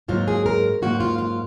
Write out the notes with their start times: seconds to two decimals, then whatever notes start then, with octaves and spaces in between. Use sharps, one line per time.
0.08 G#2 F#3 A#3 F4
0.28 G#4
0.46 A#4
0.82 G#2 F#3 A#3 F#4
1.00 F4
1.18 F4